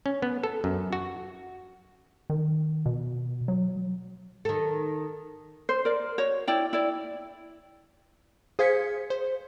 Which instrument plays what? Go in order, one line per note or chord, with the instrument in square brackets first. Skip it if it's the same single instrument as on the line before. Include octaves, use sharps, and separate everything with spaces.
[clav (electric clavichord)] C#4
B3
A4
F#2
F#4
[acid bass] D#3
B2
F#3
[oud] D#3 A4
[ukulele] C5
A#4 D5
F#4 C#5
E4 D5 G5
E4 D5
[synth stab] G#4 C5 F5 G#6 B6 C#7
C5